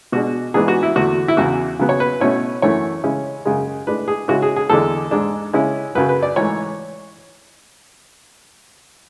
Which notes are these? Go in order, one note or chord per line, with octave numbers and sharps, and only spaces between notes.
B2 G#3 D4 F#4
G#2 E3 B3 D4 G#4
F#4
E4
E2 D3 A3 F#4
E4
E2 C#3 E3 F#4
C#3 F#3 B3
C#5
B4
B2 A3 C#4 E4 C#5
F#2 E3 A3 C#4 E4 C#5
C#3 G#3 C#4 E4
F#2 C#3 G#3
A2 G#3 D4 B4
G#4
C#3 G#3 C#4 E4 F#4
G#4
G#4
E2 D3 G#3 D4 A4
G#2 G#3 D4
C#3 G#3 C#4 E4
F#2 C#3 F#3 B4
B4
D5
G#2 E3 A3 C#5